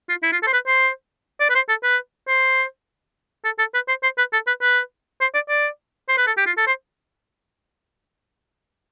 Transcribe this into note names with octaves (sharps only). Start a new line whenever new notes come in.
F4
E4
F4
A4
C5
B4
C5
D5
B4
C5
A4
B4
C5
A4
A4
B4
C5
C5
B4
A4
B4
B4
C5
D5
D5
C5
B4
A4
G4
F4
A4
C5